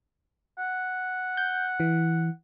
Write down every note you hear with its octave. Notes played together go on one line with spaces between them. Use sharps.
F#5
G6
E3